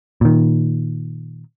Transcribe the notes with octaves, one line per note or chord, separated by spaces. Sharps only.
A#2 D#3